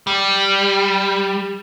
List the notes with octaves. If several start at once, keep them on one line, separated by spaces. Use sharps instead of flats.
G3